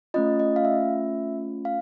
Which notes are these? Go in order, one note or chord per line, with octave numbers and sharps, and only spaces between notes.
A3 C#4 F4 D#5
D#5
F5
E5
F5